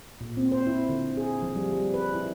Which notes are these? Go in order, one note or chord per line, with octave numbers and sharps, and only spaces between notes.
A#2
C4
C5
E4
D3
G#4
F3
G3
G3
B4
E4